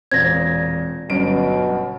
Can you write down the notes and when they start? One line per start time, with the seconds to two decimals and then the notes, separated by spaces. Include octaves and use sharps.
0.12 E1 A#2 C4 G#6 A#6
1.10 G1 F#2 B2 D7